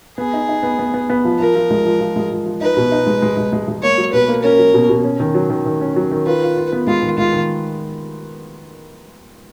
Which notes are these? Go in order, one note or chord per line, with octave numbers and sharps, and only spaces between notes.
B3 G#4
D#4
D#4
B3
B3
B3
B3
F3
F3 A#4
F3
G#3
F3
F3
G#3
F3
F3
D#4 B4
B2
D#4
G#3
G#3
G#3
G#3
G#3
A#3 C#5
F#3
B2 B4
A#3
C#4 A#4
F#3
B2
B2
C#4
D#3
F#3
D#3
D#3
C#4
F#3
D#3
F4 B4
F4
F4
B3
G#3 F4
D#3
G#3 F4
D#3